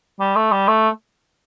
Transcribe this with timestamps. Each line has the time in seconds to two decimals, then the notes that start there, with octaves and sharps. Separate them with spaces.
0.20 G3
0.36 A3
0.52 G3
0.68 A3